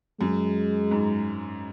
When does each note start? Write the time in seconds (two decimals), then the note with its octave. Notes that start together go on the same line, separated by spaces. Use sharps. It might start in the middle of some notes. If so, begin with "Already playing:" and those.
0.20 F#2 G#3
0.91 G#2